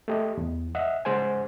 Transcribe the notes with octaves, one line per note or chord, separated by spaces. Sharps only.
A3 G4 D#5
E2
D#5 E5 F#5
C#3 G#3 C5 F#5 G#5